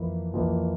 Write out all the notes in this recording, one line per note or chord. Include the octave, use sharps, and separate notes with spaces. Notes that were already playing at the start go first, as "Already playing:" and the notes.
Already playing: F2 E3 A#3 E4
F2 E3 A#3 E4